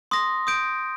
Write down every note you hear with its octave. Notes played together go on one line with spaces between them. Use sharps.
C6 D#6 A#6
D#6 G6 D7